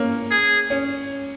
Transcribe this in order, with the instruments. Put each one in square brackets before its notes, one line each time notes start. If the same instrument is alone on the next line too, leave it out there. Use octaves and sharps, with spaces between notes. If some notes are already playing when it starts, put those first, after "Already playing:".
Already playing: [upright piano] A#3 C#4
[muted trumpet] G#4
[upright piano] C#4